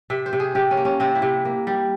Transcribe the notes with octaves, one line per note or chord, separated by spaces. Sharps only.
C3 E5
C5
C3
G#4
C3 G4
C#4
A#3
C#4
C3 C4
E4
C3
A#3
G3